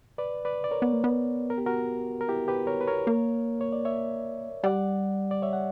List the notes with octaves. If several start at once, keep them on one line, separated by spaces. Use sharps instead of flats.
B4 D5
B4 D5
D5
A#4 C#5
B3
A#3
B3
A#4
G4
F#4 A#4
A#4
E4 G4
G4 B4
A#4 C#5
B4
A#4 C#5
A#3
C#5
D5
C#5 E5
G3 D5 F#5
D5
C#5 E5
F#5